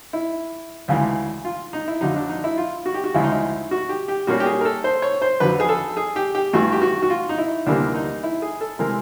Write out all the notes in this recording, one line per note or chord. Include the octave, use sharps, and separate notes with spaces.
E4
D2 C#3 E3 G#3
F4
D#4
E4
F2 D3 F#3 D#4
D4
D#4
E4
F4
F#4
G4
F#4
D2 C#3 F3 G#3 E4
D#4
E4
F#4
G4
G4
A#2 G3 A#3 C#4 F#4
G4
G#4
A#4
A4
C5
C#5
C5
F2 D3 F#3 B4
G#4
A4
G#4
G4
G4
G2 E3 A3 F#4
G4
F#4
F#4
F4
D#4
E4
D2 C3 E3 G3 A#3 D4
D#4
E4
G#4
A4
C3 E3 G#3 A#4